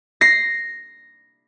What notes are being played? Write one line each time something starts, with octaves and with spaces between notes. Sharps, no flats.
A#6 C7